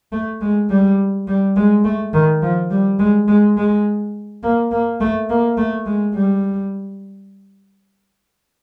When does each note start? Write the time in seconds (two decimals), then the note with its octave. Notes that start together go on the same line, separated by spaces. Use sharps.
0.12 A3
0.41 G#3
0.70 G3
1.28 G3
1.56 G#3
1.85 A3
2.14 D#3
2.42 F3
2.71 G3
2.99 G#3
3.28 G#3
3.57 G#3
4.43 A#3
4.72 A#3
5.01 A3
5.30 A#3
5.58 A3
5.86 G#3
6.15 G3